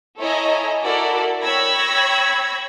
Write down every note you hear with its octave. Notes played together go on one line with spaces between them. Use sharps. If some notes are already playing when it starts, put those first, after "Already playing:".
E4 A4 C#5 D#5 G#5 A#5
E4 F#4 A4 A#4 D5
C#5 G5 B5 E6 G#6 A#6